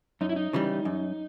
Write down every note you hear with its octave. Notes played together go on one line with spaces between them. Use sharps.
F#2 D#4
E4
D#4
C#3 E3 G3
F#2